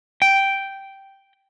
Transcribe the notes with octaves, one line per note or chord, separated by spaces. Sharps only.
G5